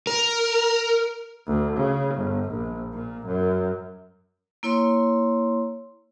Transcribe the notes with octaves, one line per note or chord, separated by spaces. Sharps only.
A#4
D2
C#3
G1
A#1
A#2
F#2
A#3 E4 C#5 C6